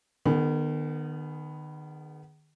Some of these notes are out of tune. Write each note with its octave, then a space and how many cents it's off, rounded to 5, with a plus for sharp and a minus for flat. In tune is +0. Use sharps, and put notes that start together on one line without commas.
D#3 -35 B3 +0 G#4 +0